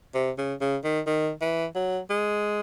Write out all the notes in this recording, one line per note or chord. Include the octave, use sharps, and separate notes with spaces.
C3
C#3
C#3
D#3
D#3
E3
F#3
G#3